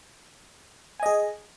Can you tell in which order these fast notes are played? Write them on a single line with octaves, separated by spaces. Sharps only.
G#5 D#5 G#4